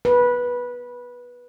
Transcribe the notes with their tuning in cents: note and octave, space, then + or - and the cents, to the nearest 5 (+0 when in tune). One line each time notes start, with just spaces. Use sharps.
B4 -15